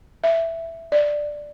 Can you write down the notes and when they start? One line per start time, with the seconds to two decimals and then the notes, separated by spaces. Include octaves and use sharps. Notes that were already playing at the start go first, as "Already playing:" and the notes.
0.24 E5
0.92 D5